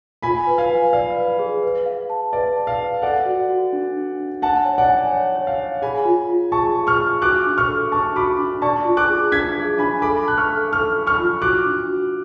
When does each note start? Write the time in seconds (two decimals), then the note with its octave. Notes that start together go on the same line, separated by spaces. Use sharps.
0.22 F4 G#5 B5
0.47 B4
0.58 F5 G#5
0.70 B4
0.93 D5 F5
1.17 B4
1.39 G#4
1.63 B4
1.86 F5
2.10 A5
2.33 B4 D5
2.56 A5
2.67 F5
2.79 B4
3.02 A4 D5 F#5
3.25 F#4
3.49 F#4
3.73 D4
3.97 D4
4.20 D4
4.42 F#5 G#5 A5
4.65 C#5
4.78 D5 F#5
4.90 G#5
5.12 C#5
5.35 C#5
5.47 F5
5.59 C#5
5.82 G#4 G#5 B5
6.05 F4
6.29 F4
6.52 G#4 A5 C#6
6.75 G#4
6.87 C#6 F6
6.98 G#4
7.22 F#4 D6 F#6
7.46 D4
7.58 C#6 F6
7.68 A4
7.92 D4 A5 C#6
8.15 F#4 B5 D6
8.38 D4
8.62 D5 A5 C#6
8.85 F4
8.97 D6 F#6
9.09 G#4
9.32 D4 G#6 B6
9.56 G#4
9.78 D4 G#5 B5
10.02 A4 B5 D6
10.26 A5 F#6
10.37 C#6 F6
10.49 A4
10.72 A4 C#6 F6
10.95 A4
11.07 C#6 F6
11.19 F4
11.42 F#4 D6 F#6
11.66 D4
11.88 F#4